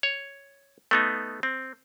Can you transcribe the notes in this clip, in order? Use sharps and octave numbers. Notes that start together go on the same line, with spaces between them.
C#5
A3 B3 D#4
C4